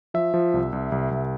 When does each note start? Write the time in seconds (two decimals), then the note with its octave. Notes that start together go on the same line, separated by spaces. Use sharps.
0.14 F3 E5
0.34 F3
0.54 C2
0.73 C2
0.92 C2
1.11 C2